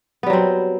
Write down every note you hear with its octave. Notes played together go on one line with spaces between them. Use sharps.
F#3 G3 B3 C4